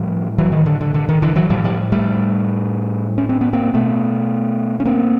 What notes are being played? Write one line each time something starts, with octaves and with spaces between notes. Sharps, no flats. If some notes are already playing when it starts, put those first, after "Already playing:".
Already playing: A2 F3 G3
E3 F#3
D#3
D3
D3
D3
D#3
D3 E3
E3 F#3
A2 F3 G3
F3 G3
G3 A3
C#4
C4
B3
A#3 C4
B2 A3 B3
C#4
A#3 C4